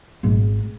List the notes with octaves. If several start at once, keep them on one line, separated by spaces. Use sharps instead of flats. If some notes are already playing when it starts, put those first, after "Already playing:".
G#1